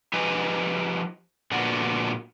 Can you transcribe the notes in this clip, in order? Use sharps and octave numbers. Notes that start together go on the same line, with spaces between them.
F3 D#4 G4 B4 D#5 G#5
A#2 D3 F3 B3 F#4